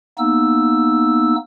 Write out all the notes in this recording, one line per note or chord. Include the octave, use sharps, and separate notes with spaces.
A#3 B3 D#4 E6